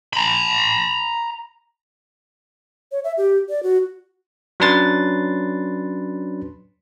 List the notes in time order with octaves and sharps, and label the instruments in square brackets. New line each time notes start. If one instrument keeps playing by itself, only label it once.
[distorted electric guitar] A#5 B5
[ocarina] C#5
E5
G4
D5
F#4
[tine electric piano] F#3 C#4 D4 B4 C6 A6